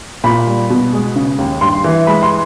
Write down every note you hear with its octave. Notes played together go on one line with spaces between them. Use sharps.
A#2 B5
G3
B2
G#3
C#3
D#2
G2 C6
E3
G#3 B5
C6